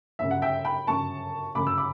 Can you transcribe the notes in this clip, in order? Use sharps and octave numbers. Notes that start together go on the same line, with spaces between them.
G1 F#2 C#3 E5
F#5
E5 G5
G5 B5
G1 F#2 C#3 A5 C#6
G1 F#2 C#3 B5 D6
E6
B5 D6